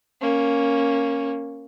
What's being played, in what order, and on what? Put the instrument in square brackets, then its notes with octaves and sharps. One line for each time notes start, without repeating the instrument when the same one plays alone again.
[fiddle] A#3 C#4